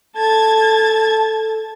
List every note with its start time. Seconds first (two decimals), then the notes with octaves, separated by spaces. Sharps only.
0.15 A4 A5 G#6 A6